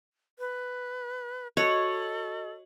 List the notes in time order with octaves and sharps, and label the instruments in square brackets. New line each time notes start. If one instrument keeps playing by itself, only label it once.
[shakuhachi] B4
[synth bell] F#4 D#5 F#7 [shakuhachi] A4 [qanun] C#5